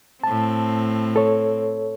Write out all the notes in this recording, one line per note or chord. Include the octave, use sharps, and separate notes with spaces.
A2 C4 A5
A4 C#5